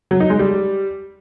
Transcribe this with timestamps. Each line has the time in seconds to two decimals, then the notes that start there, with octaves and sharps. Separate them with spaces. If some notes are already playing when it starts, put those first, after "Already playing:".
0.11 F#3
0.20 D#4
0.30 G#3
0.39 G3